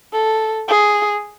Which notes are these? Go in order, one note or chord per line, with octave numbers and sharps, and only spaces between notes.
A4
G#4